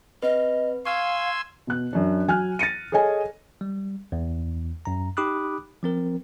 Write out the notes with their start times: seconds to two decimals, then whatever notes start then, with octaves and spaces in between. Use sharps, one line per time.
0.23 C4 B4 D#5
0.85 F5 G#5 C6 C#6 E6 F6 G#6
1.67 B2 F#6
1.93 F#2 D4
2.28 F#3 G#5 F6 F#6
2.59 A6 A#6 C#7 D#7
2.92 G#4 A4 C#5 D#5 G#5
3.61 G3
4.12 E2
4.85 F#2 A#5
5.17 D#4 G4 B5 D6 D#6 F#6
5.83 F3 C4 A#4